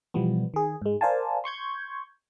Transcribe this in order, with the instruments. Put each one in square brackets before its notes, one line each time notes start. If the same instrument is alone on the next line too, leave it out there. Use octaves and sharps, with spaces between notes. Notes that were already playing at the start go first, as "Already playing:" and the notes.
[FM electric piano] B2 E3 F3 G3 B3
D#3 G#4
G#2 G#3
A#4 C5 D5 F5 G#5 A5
C6 C#6 G6 G#6